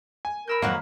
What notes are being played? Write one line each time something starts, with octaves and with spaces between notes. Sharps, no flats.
G#5
A#4 B5 E6 G6
F2 D#3 F#3 A#3 F#4